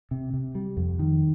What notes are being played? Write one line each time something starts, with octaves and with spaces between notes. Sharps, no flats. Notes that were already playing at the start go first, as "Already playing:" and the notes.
C3
C3
G3
F2
D#3